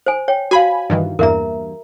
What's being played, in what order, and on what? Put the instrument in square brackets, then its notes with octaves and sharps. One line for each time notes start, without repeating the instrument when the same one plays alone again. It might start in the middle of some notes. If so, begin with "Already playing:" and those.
[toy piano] C5 G#5
C#5 G5
[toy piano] F#4 F5 [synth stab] G#5 B5
[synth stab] G2 D#3 E3
[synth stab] E2 G2 A#3 [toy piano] A#4 E5 A#5